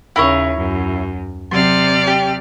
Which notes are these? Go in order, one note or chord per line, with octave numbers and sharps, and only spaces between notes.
D#2 C#3 E4 A#4 C#5 B5
F#2
C3 F#3 D5 C6 F6
G4